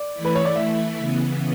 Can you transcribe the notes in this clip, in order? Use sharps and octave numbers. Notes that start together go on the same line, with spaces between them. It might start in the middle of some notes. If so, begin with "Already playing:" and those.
Already playing: D5
E3 A3 E4
B4
C#5
D5
E5
C#3 E3 B3